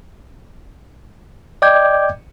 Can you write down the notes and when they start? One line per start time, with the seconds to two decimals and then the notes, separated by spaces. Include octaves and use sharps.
1.62 D5 D#5 G5 D6 G6 G#6